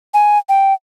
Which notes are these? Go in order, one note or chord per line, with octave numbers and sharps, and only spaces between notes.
G#5
G5